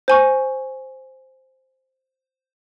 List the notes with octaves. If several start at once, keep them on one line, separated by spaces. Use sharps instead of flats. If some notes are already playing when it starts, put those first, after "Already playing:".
C5 G#5 C#6